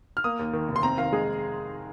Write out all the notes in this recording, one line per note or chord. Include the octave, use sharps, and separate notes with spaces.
F6
A#3 D#6
D#2
D#3
F1
C6
C4 A#5
D#3 F5
G#3 G#4